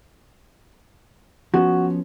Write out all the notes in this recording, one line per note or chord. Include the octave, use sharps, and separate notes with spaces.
F3 B3 C#4 F#4